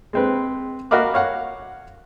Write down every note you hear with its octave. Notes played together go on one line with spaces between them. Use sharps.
G#3 C4 B4
F#4 A#4 D#5 F5 B5 D6
C#5 F5 F#5